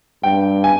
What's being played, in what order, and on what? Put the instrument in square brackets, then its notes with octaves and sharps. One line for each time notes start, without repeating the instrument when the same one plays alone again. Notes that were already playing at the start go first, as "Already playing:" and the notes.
[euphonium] G2 [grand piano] G5
[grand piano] G#5